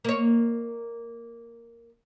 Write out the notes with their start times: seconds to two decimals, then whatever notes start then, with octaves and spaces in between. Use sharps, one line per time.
0.05 A#3 C#5